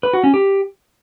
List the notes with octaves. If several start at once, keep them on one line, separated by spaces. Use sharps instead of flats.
B4
F#4
C#4
G4